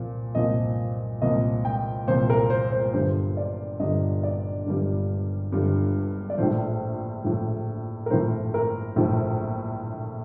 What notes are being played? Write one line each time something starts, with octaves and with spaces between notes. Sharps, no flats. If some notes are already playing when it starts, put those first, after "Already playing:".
Already playing: C2 A#2 F3
C2 A#2 F3 D#5
C2 A#2 F3 D#5
G5
C2 A#2 F3 C5
A#4
C5
C5
G1 G2 D3 G3 C5
D5
G1 G2 D3 G3 D#5
D5
G1 G2 D3 G3
G1 G2 D3 G3
D5
A#1 A2 F3 C5
A#1 A2 F3
A#4
A#1 A2 F3 C5
A#4
A#1 A2 F3